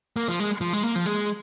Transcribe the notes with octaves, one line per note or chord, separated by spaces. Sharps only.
A#3
F3
G#3
F3
G#3
A#3
F3
G#3